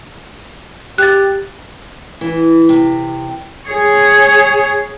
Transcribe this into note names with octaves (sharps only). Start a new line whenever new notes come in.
G4 F#6 A6
E3
C3
G#4 C#5